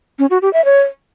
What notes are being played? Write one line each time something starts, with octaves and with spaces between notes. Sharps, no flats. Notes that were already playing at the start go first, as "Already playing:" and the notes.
C#4
F#4
G4
E5
C#5